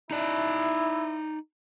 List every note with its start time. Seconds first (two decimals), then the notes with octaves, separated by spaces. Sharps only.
0.11 D#4 E4 D5